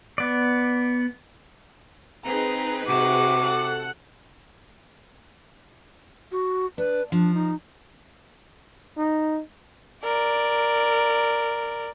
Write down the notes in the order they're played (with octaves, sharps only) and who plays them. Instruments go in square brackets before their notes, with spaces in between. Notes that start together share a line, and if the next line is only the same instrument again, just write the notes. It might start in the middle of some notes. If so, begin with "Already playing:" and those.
[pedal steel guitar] B3 D5
[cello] C4 [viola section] D#4 G#4 B4 [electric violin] A#5
[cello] C3 [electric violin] F#4 [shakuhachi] D6
[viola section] A4 F#5
[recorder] F#4
[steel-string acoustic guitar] D4 [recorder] B4
[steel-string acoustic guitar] F3 [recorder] D4
[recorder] D#4
[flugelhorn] D#4
[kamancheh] A#4 D5